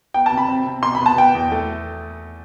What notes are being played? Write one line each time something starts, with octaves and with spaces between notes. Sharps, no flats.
B3 G5
A5
C3
B5
C4
C3
B2 C6
B5
B3 A5
B3 G5
E2
A3